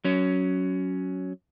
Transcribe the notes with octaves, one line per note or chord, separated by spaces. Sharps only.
F#3 C#4